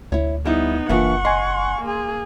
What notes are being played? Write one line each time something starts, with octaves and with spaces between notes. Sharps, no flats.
D2 E4 C#5
G3 B3 D#4 E4
F#1 E3 A#3 D4 F4 E5 F#5 C#6
D#5 G#5 C6
A#3 G#4